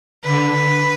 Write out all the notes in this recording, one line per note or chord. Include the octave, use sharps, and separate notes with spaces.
D3 B4